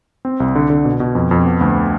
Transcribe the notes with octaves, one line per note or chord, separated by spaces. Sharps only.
C4
C2
D3
D3
B2
B2
F2
F2
B3
D2